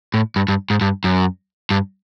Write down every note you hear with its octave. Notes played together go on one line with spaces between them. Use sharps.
A2
G2
G2
G#2
G2
F#2
G2